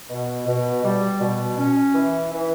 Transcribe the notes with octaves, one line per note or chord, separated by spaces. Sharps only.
B2
B2
G3
B2
C#4
E3
E3